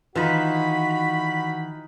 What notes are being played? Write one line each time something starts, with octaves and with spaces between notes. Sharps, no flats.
D#3 E3 D#4 F4 F#4 B4 B5